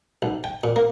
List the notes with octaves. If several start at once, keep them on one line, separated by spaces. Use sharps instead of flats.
B1
G5
A#2
A#3